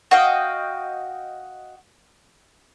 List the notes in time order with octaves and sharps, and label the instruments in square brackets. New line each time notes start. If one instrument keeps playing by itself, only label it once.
[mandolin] F#4 D#5 F5 G5